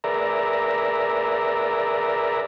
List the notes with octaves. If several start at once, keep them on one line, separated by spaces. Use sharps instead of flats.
G#4 A#4 B4 D5 E5 A#5